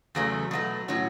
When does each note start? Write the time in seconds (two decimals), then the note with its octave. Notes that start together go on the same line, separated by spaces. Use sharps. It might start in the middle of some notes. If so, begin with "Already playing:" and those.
0.15 E2 C#3 F#3 A3
0.51 B2 F#3 A3
0.88 A2 F#3 C#4 E4